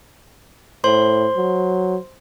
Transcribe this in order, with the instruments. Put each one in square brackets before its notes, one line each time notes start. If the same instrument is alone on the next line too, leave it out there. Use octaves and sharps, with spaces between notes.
[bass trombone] A2 [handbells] C5 C6
[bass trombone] F#3